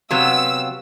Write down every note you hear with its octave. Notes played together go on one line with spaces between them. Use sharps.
C3 F#3 B3 F5 E6